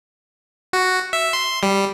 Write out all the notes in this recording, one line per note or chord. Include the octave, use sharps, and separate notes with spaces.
F#4
E5
C6
G3